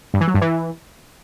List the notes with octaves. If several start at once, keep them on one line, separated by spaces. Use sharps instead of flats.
G2
E3
F#3
G2
E3